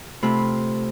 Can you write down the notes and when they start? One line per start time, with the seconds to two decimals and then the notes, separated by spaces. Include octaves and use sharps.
0.23 C3 A3 F4 B5